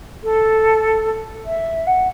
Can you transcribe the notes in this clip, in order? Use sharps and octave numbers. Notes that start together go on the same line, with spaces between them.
A4
E5
F#5